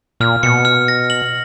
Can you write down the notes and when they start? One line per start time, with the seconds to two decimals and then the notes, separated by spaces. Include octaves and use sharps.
0.20 A#2 F6
0.43 B2 C#7
0.65 F6
0.88 A#6
1.10 F#7